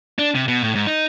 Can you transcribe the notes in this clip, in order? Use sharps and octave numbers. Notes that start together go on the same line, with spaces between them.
D4
C3
B2
A2
G#2
D#4